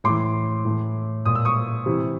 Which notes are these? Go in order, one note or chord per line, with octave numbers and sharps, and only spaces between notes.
A2 E3 C6 D6
A2 E3
A#2 D#6
E6
C#6 D#6
C3 E3